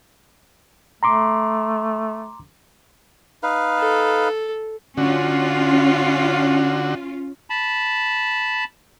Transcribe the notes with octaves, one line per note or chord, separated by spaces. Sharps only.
A3 A#5 C6 D6
D#4 B4 F5
A4
D3 C#4 F4 F#4
A5 B5